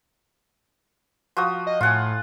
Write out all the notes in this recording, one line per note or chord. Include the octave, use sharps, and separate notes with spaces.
F3 F#4 D#6
D#5
A2 F4 F#5 G#5